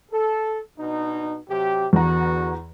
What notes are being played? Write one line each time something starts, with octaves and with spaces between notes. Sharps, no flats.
A4
B2 D4 D#4
C3 F#3 G4
E2 D3 B3 F#4 A#5